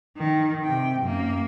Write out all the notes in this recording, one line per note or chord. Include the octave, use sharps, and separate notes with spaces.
D#3
C3 G5
F#2 A#3